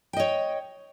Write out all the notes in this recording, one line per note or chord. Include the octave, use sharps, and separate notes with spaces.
C#5 D#5 G5